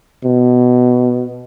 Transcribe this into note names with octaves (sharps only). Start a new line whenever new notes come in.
B2